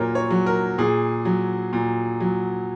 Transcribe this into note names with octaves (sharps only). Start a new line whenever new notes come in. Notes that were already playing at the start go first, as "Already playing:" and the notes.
Already playing: A#2 F#3 A#4 C#5
C#5
F#3
A#4
A#2 G#4
F#3
A#2
F#3